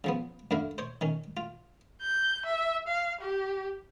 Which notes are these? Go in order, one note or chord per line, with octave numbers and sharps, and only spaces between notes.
C#3 F3 B3
F#2 D3 E4 F5
C5 C#5
D#3 C#4
F4
G6
E5
F5
G4